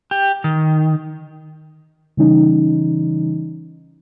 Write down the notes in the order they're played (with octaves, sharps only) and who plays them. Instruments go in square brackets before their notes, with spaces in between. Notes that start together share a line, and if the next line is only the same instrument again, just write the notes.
[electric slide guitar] G4
D#3
[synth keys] C#3 E3 G3 C#4 D#4